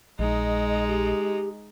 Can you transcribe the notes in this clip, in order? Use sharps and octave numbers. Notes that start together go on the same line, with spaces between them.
A#1 G#3 D#4 D#5
G4